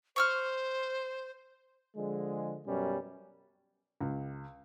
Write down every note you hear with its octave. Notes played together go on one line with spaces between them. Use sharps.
C5 C#6 E6 F6
D3 F3 G#3
F#2 B2 G3 C#4
C#2